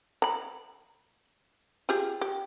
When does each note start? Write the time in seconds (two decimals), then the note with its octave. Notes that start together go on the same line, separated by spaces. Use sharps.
0.22 A#5 B5
1.89 F4 G4 G#4
2.21 G4